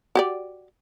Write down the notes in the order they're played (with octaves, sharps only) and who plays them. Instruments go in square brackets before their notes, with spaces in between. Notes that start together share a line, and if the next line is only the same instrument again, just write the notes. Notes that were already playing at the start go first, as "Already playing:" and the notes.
[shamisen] F#4 G4 D5